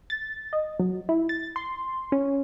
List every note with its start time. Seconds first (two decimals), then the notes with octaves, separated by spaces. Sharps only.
0.10 A6
0.53 D#5
0.80 F#3
1.09 E4
1.29 A6
1.56 C6
2.12 C#4